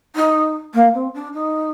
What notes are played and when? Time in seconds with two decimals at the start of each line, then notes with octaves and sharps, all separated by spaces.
0.15 D#4
0.74 A#3
0.94 C4
1.14 D4
1.33 D#4